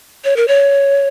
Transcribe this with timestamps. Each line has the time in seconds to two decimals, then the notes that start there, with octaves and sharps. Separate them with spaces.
0.24 C#5
0.36 A#4
0.48 C#5